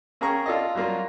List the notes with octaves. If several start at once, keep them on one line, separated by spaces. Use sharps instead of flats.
A#3 C#4 G#4 G5 A#5 C#6
F4 A4 D5 D#5
F#3 G3 A#3 F4